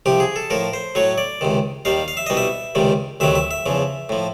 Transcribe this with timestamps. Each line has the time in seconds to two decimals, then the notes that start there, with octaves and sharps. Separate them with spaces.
0.06 C2 C3 F3 G4
0.20 G#4
0.36 A4
0.50 A2 F3 A#4
0.73 C5
0.95 A2 F#3 C#5
1.18 D5
1.41 C#2 C3 D#3
1.85 D#2 D#3 G3 F5
2.08 F5
2.17 E5
2.26 C2 B2 G3 D#5
2.37 E5
2.75 C#2 C3 D#3 G3
3.20 D2 C3 D#3 F#3 E5
3.35 E5
3.51 E5
3.66 E2 C#3 F3
4.09 A2 F3